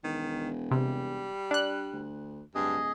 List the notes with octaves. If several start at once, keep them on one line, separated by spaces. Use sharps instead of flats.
E1 D#3
C3 G3
D4 F#6
D2
D1 G2 G#4 D#5